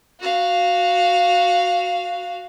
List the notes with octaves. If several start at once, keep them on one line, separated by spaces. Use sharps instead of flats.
F#4 F5